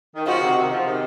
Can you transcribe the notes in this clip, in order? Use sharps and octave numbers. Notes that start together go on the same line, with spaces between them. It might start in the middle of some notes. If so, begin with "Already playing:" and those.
D#3
C#3 F3 F#4
C3 D#3
C3 D#3
C#3 F3
C3 D#3